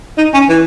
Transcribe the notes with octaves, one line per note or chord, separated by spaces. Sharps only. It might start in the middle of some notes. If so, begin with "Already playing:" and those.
D#4
C#4
E3